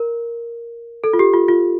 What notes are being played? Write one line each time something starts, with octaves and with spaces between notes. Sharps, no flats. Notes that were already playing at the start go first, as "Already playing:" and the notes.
Already playing: A#4
A4
F4
G4
F4
F4